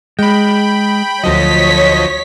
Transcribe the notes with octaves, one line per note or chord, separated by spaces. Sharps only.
G#3 G5 B5
D2 F3 F#3 C#5 D#5 B6